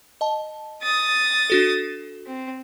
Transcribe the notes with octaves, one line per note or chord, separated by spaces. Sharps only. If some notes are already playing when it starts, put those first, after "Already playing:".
D#5 A5
D#6 A6
D4 F#4 A4
C4